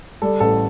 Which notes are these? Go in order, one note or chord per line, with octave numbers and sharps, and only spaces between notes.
G3 A4
A1 A4